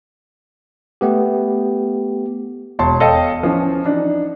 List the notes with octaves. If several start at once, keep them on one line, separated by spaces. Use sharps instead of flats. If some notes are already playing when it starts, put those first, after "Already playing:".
A3 B3 G4
E1 C#5 A5 C6
A4 C#5 D#5 F5 G5 A5
E3 F3 C#4
D4 D#4